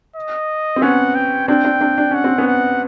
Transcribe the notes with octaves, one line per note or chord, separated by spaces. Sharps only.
D#5
C4
B3 C#4 F#5
G5
C4 D4 G5
C4 D4
C4 D4
D4
C#4 F#5
C4
B3 C#4
F#5